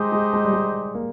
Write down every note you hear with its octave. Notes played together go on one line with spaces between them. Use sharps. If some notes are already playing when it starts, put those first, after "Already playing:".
Already playing: G#3 D#4 G4 C5 D#5
G#3
G#3
G3
G#3
A#3